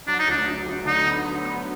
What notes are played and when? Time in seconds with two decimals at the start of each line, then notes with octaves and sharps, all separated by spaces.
0.08 F#3 D4
0.19 D#4
0.28 D2 D4
0.47 D2
0.67 D2
0.86 D3 D#4
1.06 B3
1.25 F#3
1.45 B3